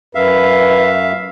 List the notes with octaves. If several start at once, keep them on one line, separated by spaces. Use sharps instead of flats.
F#2 B4 E5 F5